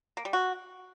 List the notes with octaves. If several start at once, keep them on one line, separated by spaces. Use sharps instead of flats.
A#3
G3
F#4